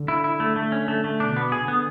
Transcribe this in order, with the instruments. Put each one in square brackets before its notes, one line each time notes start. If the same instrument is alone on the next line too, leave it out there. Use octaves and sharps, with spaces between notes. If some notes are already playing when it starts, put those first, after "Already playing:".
Already playing: [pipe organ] D3
[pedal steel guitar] E4
E4
A3
A3
C#4
A3
A3
[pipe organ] B2 [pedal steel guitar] D4
[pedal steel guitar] B3
[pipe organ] D3 [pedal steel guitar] G#4
[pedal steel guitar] B3